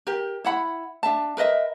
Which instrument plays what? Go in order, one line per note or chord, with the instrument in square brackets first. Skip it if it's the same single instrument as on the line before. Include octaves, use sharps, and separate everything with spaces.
[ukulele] G4 A#4
E4 F#5 B5
D4 E5 A5
A#4 B4 D#5 E5